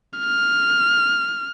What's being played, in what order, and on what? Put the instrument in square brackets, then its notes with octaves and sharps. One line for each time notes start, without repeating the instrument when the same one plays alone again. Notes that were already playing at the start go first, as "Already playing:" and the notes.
[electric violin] F6